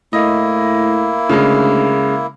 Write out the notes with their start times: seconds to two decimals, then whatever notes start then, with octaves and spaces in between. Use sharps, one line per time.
0.13 A2 A#3 E4 D#5
1.29 D2 C#3 G#3